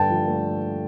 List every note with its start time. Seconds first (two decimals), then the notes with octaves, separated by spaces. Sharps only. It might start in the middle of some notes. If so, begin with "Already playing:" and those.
Already playing: G2 D3 G5 A5
0.10 F3
0.28 A3